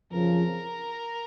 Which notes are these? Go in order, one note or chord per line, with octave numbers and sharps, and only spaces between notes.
F2 C#3 F3 A#4